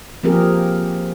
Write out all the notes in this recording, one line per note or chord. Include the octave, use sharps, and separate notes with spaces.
F3 A#3 C4 G4 G#4 A#4